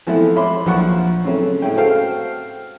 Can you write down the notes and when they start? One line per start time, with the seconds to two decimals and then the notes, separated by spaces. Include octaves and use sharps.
0.07 E3 F3 A3 B3 C4 E4
0.36 C#5 E5 B5 C6 D6
0.66 A#1 F3 F#3 F#5 C#6
1.25 C#3 F#3 A3 C4 C#4 E4
1.62 A2 G#3 C#4 E4 G5
1.76 F#4 A4 C5 F5 G5